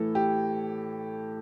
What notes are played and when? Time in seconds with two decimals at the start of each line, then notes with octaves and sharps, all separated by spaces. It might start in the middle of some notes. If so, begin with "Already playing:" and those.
Already playing: A2 E3 A4
0.15 G4